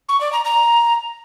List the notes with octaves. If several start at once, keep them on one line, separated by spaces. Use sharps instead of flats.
C#6
D5
A#5
A#5